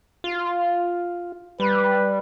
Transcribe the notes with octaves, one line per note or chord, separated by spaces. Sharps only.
F4
G3 B4